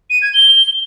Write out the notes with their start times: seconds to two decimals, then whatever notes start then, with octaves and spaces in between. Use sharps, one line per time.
0.10 D#7
0.22 G#6
0.34 G7